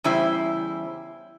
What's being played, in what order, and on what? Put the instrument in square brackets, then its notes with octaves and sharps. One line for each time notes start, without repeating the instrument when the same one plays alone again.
[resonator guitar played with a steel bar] E2 C#3 G3 E4 C5